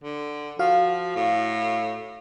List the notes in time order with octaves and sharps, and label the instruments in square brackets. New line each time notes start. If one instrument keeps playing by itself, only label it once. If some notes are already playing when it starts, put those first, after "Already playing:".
[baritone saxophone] D3
[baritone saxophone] F3 [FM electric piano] F#4 F5
[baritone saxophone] A2